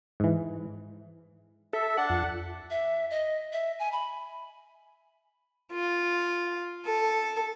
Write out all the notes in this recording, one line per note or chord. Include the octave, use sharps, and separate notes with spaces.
G#2 E3
A4 E5
D4 F#5 A5
F2 F4
E5
D#5
E5
G#5
B5
F4
A4